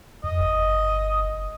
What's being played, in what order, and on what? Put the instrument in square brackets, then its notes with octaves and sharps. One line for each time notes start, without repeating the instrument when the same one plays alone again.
[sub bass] F2 [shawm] D#5
[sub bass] G1